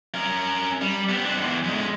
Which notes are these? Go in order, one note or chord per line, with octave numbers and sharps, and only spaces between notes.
C#4 A#4
G3
B3 C4
D4 C5
E2 G#2
F#2 G#3